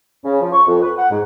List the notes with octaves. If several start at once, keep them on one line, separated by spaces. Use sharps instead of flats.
C#3
F3
C#6
F2
B4
F#5
G#2